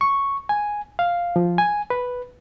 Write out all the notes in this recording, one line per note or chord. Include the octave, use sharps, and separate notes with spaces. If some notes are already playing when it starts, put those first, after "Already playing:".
C#6
G#5
F5
F3
G#5
B4